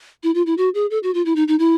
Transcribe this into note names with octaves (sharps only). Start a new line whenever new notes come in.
E4
F4
E4
F#4
G#4
A4
F#4
F4
E4
D#4
D#4
E4